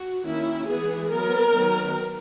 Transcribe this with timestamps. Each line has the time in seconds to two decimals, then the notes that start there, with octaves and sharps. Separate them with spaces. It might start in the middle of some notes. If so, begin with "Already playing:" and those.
Already playing: F#4
0.25 D#3 A#3 C#4 E4
0.67 E3 G#3 B3 G#4
1.10 F#3 B3 A#4
1.52 D#3 F#3 B3